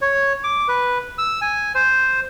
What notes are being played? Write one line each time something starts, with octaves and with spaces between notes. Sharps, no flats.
C#5
D6
B4
E6
G#5
C5